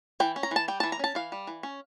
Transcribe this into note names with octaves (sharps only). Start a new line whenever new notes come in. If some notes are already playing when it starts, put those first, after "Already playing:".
E3 G5
C#4
A#5
E3 A5
G3 G5
E3 A5
A#5
C#4 A5
E3 F5
G3
E3
C#4